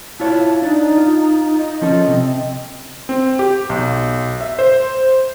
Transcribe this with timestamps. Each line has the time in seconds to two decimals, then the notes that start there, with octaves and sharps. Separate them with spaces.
0.20 E4 F4 C#5 A5
0.62 D4 D#4
0.97 F4
1.57 D#5
1.82 F3 C#4 A4
2.08 C3
3.09 C4
3.39 G4
3.70 B1
4.41 E5
4.59 C5